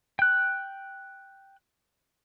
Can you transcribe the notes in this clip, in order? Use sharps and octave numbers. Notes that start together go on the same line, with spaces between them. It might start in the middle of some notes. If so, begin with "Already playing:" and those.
G5 F#6